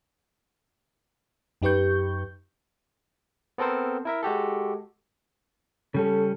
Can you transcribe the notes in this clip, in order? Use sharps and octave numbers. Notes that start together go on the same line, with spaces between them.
F#2 D#4 G4 B4 C#6 G6
B3 C4 A4 A#4 C5
E4 A#4 E5
G#3 F#4 G4 A4
C#3 G3 C#4 A4